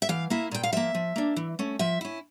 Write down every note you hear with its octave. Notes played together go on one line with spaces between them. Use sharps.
E5
E3 F5
A#3 E4 E5
A#2 G5
F5
F3 A#3 E5
F3
A#3 D4
E3
A3 C#4
F3 E5
C#4 E4